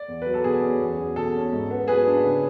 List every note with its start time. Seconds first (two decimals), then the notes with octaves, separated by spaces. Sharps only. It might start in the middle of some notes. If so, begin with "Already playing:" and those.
Already playing: D5
0.08 E2
0.22 F#3 B4
0.34 A4
0.44 B2 G#4
0.62 C#4
0.81 E2
0.98 F#3
1.16 B2 A4
1.35 C#4
1.53 G#2
1.70 B3
1.88 F#3 G#4 B4
2.07 D4
2.24 C#3